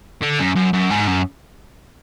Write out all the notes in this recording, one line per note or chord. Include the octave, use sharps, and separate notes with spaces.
D3
F#2
F#2
F#2
G#2
F#2